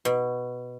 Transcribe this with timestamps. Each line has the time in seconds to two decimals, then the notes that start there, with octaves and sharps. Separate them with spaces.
0.05 B2